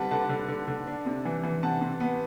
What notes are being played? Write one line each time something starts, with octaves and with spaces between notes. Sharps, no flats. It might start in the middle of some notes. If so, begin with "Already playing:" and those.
Already playing: D3 G3 C4 B4 F#5 A5
D3 F#5 A5
D3
D3
D3
D4
C3
E3
E3
C3 F#5 A5
C3
B3